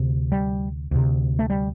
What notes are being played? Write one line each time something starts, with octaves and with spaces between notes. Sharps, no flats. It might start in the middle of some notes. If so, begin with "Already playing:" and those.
Already playing: D2 C3
G3
D2 C3
A3
G3